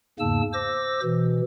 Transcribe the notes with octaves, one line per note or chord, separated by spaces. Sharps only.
E2 G#2 C#3 A#3 A5 E6
C5 D6 E6 A#6
B2 E3